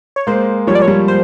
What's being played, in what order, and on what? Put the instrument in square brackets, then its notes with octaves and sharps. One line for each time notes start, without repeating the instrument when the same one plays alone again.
[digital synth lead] C#5
[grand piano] G#3 A#3 [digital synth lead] C5
[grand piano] F3 G3 [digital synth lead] C#5
[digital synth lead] D5
C#5
[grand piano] F3 G3
[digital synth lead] C5